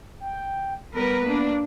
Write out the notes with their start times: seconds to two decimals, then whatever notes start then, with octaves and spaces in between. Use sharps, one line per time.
0.20 G5
0.94 G3 B3 A#4 B4
1.25 A#3 D4